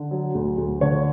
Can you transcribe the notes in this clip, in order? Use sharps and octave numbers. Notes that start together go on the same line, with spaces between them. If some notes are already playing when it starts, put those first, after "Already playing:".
Already playing: D3
F#3
D2
D2
D3 C#5